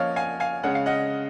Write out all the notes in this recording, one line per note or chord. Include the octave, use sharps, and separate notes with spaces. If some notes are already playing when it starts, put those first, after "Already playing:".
Already playing: F3 A#3 C#4 C#5 D#5 F5
F5 G#5
F5 G#5
C#3 G#3 C#4 F#5
F5
D#5 F#5